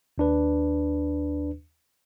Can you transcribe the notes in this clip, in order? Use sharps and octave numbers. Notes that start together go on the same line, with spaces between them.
D#2 D4 B4